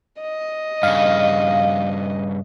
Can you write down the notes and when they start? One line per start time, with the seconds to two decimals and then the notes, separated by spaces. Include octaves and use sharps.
0.22 D#5
0.83 G2 C#3 F5